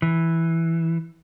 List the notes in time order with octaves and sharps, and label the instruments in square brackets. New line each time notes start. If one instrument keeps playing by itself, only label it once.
[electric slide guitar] E3